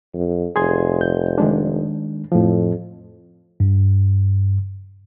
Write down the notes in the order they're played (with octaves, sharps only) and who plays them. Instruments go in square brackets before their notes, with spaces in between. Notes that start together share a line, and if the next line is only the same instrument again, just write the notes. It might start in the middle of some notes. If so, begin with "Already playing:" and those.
[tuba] F2
[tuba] F1 [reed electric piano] G#4 C6 G#6
[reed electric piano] G6
D#3 G#3 D4
[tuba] F2 [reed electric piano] A2 F3
[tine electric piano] G2